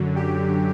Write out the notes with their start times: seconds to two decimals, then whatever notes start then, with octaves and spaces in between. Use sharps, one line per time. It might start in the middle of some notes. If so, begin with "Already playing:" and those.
Already playing: F#2 D3 F#3
0.16 G4